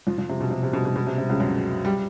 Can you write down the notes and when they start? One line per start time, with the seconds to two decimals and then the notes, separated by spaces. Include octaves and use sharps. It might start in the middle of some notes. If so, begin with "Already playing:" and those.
0.07 F2 F3
0.18 F2 F3
0.29 C3
0.41 B2
0.51 C3
0.63 C3
0.73 B2
0.85 B2
0.96 B2
1.07 C3
1.18 C3
1.29 C#2 C#3
1.40 F#2 F#3
1.85 G3